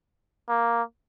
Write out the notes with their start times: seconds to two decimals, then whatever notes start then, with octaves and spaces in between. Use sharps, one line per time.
0.49 A#3